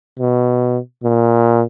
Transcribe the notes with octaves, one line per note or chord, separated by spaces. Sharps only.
B2
A#2